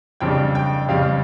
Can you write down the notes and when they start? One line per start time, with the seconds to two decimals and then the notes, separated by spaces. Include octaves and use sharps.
0.20 F2 C#3 G3 D4 G5
0.55 G5
0.89 F2 C#3 G3 F5